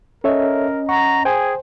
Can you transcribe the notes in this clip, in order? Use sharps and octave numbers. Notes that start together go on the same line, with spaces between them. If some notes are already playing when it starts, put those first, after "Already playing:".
C#4 A4 A#4 C#5 D#5 E5
F#5 A#5 C#6
G#4 C5 G5 G#5